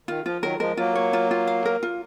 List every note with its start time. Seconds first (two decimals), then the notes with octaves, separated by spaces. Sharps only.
0.08 D#3 F4
0.25 F3 F4
0.43 D#3 F#3 A#4
0.60 F3 G#3 A#4
0.77 F#3 A#3 F4
0.95 C#5
1.13 F4
1.31 F4
1.47 F5
1.65 A#4
1.83 F4